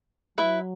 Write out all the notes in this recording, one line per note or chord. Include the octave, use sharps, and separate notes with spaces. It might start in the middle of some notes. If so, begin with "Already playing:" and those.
F#3 E4 B4 E5